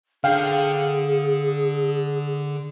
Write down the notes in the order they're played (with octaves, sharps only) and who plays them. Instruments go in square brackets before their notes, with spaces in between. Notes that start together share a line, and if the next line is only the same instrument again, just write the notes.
[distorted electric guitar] D3 [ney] G#4 [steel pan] F5 G5